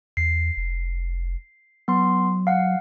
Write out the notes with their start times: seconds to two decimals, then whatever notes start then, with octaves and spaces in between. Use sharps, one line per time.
0.17 E2 C7
0.57 F1
1.88 F#3 B3 C6
2.47 F5 F#5